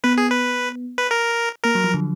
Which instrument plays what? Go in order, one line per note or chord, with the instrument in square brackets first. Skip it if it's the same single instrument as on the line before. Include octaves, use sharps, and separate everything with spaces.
[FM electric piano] B3 [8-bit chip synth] B4
[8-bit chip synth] G#4
B4
B4
A#4
[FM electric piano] A#3 [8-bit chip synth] A#4
[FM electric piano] F#3
F3
D3